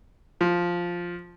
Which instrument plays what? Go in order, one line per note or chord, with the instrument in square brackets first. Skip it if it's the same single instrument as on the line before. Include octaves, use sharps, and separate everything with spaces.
[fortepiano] F3